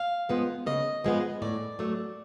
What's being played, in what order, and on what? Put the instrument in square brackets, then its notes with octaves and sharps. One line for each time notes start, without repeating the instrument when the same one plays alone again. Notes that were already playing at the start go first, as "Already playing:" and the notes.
Already playing: [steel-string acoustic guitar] F5
F3 G#3 B3
C#3 D#5
F3 G#3 B3
A2 D5
F#3 A3